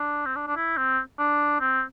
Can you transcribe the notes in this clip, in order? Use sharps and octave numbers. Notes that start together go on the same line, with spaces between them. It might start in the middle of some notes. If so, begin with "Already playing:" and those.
Already playing: D4
C4
D4
D4
E4
C4
D4
C4